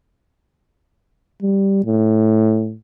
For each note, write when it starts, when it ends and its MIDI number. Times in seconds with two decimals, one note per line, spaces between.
1.43 1.84 55
1.85 2.74 45